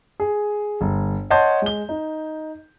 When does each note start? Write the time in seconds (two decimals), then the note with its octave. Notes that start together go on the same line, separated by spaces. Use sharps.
0.20 G#4
0.81 G1
1.30 C#5 D#5 F#5 A5 C6 G6
1.62 G#3 G7
1.89 D#4